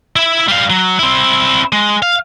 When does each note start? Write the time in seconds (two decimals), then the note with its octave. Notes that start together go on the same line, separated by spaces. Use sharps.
0.16 E4 E5
0.48 G3 F5
0.70 F#3
0.99 C4 E4
1.73 G#3
2.02 F5